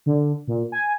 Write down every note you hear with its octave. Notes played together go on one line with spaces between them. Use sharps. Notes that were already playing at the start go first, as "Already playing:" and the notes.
D3
A#2
G#5